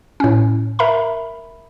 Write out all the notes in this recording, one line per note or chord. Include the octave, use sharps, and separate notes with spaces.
A2 C#4
A#4 E5 A#5 B5